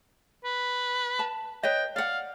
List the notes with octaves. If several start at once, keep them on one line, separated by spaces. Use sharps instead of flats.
B4
A5
B4 C#5 D#5 G5
D5 F5 F#5